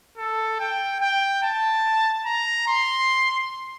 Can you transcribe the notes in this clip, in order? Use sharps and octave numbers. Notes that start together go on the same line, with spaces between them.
A4
G5
G5
A5
A#5
C6